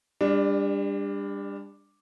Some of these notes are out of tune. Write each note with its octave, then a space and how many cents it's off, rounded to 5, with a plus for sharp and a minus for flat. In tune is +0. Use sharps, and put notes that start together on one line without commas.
G3 +35 D4 +0